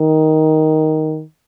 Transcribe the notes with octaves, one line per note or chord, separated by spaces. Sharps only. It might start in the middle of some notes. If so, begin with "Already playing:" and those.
Already playing: D#3